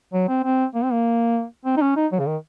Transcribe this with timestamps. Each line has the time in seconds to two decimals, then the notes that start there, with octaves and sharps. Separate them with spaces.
0.13 F#3
0.29 C4
0.44 C4
0.74 A#3
0.84 C4
0.92 A#3
1.66 C4
1.77 D#4
1.82 C#4
1.96 D#4
2.12 F#3
2.19 C#3
2.26 D#3